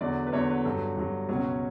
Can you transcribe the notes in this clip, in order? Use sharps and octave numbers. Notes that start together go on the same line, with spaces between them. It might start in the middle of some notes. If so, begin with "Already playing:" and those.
E2 D3 F#3 D5
B4
E2 D3 F#3 C#5
B4
G2 F#3 A4
G2 F#3
C#2 B2 F#3 C#4